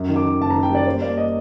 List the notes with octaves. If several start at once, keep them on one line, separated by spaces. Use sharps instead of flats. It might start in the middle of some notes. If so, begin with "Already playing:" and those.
Already playing: F#2
D#3
D6
D#3
F#1 A5
A#5
D#3
G5
G3 D5
A#3 C5
A#3 D5
D#5